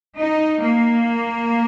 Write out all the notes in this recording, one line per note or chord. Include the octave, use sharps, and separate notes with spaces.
D#4
A#3